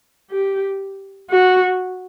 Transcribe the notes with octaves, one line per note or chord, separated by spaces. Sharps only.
G4
F#4